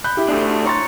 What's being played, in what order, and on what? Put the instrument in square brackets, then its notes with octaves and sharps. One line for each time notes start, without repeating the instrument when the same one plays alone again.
[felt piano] B5 F#6 G6
E4 G4
[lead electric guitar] A3 D4
[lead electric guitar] C#5 [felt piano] A#5 C6 A6